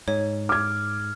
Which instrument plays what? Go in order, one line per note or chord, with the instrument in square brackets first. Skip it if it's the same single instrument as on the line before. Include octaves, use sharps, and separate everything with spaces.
[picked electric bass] G#2 [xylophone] C#5
[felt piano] D6 G#6 [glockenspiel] F6